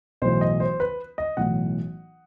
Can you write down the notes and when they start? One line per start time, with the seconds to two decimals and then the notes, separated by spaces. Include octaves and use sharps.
0.22 B1 A2 E3 C5
0.41 D#5
0.60 C5
0.80 B4
1.18 D#5
1.37 B1 A2 E3 F#5